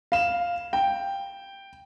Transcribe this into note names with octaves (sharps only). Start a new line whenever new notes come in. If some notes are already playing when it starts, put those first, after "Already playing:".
F5 E7
G5